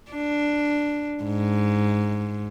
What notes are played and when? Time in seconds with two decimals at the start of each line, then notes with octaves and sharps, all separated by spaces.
0.11 D4
1.24 G#2